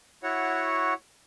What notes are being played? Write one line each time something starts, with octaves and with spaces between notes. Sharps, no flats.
E4 F#4 C#5 F#5